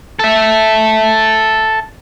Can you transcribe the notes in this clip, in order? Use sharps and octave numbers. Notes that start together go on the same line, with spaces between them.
A4 E5